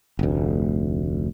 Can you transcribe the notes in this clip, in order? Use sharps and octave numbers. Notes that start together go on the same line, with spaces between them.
F1 D2